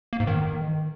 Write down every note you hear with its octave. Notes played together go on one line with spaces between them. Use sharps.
A#3
G#2
D#3